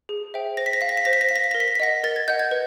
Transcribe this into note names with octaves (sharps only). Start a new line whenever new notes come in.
G#4
C5 E5 G5
C5 A#6
B6
A#6
F5 B6
A#6
B6
C5 A#6
B6
A#6
F5 B6
A#6
B6
A#6
A#4
B6
A#6
B6
D#5 F#5 A#6
A#4 A6
G#6
D#5 F#5 G6
G#6
B4